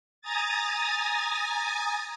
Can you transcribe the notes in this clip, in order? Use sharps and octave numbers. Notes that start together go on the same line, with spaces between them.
G#5 A#5 D#6 A6